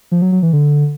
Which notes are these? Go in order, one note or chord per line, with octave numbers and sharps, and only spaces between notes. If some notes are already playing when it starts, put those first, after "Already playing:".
F3
F#3
F#3
E3
D3